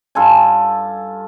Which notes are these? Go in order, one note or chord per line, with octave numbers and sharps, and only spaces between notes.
G2 F4 A4 G#5